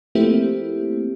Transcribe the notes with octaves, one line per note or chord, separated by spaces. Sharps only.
F3 A3 A#3 C4 E4 G4